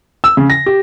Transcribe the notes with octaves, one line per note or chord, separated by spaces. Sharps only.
E6
C#3
A#6
G4